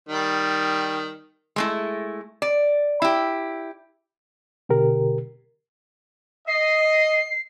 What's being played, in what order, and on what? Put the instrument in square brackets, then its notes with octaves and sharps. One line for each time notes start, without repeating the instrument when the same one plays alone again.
[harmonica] D#3 G3
[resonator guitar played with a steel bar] G#3 A3 E4
D5
E4 G4
[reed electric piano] B2 D3 G4 A#4
[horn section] D#5 [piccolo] C7